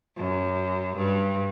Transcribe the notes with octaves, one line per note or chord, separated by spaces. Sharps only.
F#2
G2